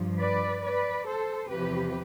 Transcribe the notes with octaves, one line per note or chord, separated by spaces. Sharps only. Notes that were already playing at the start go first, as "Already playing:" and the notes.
Already playing: G2 F3
B4 D5
B4 D5
A4 C5
E2 C3 F3 G4 B4